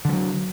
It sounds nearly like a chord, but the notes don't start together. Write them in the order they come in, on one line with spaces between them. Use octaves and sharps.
D3 F3 F#3